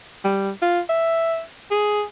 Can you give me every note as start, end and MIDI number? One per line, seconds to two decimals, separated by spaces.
0.25 0.50 55
0.62 0.80 65
0.90 1.42 76
1.71 2.03 68